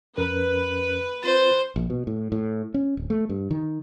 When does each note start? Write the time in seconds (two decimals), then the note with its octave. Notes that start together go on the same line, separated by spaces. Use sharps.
0.18 F2 C#4 A#4 B4
1.23 C4 F4 C5 A6
1.76 A#1
1.90 B2
2.07 A2
2.32 A2
2.74 C#4
2.97 D1
3.10 A3
3.29 G2
3.51 D#3